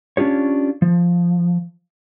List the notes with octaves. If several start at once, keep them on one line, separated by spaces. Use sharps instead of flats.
C#4 D4 F4 G4 C#5
F3